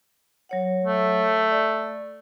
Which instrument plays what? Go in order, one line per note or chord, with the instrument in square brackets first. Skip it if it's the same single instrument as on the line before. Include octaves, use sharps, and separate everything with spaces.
[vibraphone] F#3 C#5 F#5
[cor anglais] A3
[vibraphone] D5